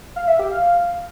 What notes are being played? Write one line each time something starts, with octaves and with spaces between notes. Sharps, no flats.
F5
E5
G4
F5